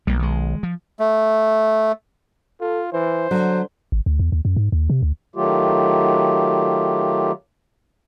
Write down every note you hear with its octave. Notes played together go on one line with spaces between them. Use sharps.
B1 G3 A#3
D#3 G#3
F3
A3
F4 A4
E3 C5
D3 F#3
G#1
D2
E2
D#2
F#2
G#2
D#2
C3
D2
D#3 F#3 A3 F4 G4